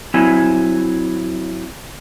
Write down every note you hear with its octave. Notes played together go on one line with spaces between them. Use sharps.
F#3 C4 E4 G#5